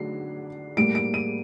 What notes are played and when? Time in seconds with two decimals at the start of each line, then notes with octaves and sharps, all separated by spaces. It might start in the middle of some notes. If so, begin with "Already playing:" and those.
Already playing: D3 F#3 D4 C7
0.77 A2 G3 A#3 D7
0.95 D7
1.14 D#7